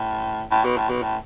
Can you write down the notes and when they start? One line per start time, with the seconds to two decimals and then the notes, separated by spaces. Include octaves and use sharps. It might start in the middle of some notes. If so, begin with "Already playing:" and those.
Already playing: A2
0.51 A2
0.65 B2
0.77 A2
0.90 B2
1.02 A2